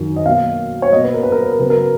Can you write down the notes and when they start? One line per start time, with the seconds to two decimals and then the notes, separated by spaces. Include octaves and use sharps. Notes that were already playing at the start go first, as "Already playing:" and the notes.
Already playing: F#2 D#3 F#3
0.16 D#5
0.26 B2 F#3 A#3 F5
0.82 C#5
0.92 B2 A#3 D#5
1.04 B4
1.14 A#4
1.23 B4
1.32 A#4
1.42 B4
1.51 A#4
1.59 C#3 F#3 B3 B4
1.70 A#4